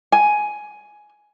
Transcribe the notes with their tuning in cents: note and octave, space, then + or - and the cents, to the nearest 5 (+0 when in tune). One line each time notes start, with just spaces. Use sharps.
G#5 +10